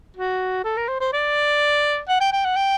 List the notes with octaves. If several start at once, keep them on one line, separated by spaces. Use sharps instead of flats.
F#4
A4
A#4
C5
C5
D5
F#5
G5
G5
F#5
G5